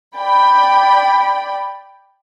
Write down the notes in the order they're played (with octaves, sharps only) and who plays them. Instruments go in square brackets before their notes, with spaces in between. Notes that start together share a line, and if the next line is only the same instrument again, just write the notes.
[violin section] D5 G5 B5